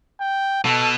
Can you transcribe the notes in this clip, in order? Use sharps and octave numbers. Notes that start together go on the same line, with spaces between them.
G5
B2 A4